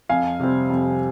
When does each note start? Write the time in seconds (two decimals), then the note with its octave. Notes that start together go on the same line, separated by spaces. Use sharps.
0.09 F2 F5 G#5
0.40 C3 G3 C4
0.70 F2